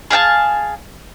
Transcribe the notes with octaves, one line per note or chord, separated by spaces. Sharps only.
G#4 F5 G5 A5